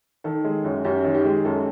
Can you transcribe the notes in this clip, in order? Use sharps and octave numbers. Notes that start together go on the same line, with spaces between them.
D#3 A4
G#3
F#2
F#2 G4
D#3
G4
G#3
F#2 A4